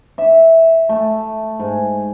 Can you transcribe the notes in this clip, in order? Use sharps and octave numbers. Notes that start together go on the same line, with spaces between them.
E5
A3
G#2